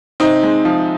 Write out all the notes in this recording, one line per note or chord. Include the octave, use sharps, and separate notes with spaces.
C3 C4 D#4
G#3
F3